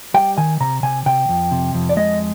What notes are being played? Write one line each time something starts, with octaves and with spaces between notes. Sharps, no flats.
G3 G5
D#3 G#5
C3 A#5
C3 G#5
C3 G5
F2
C3
F2
D5
G#3 D#5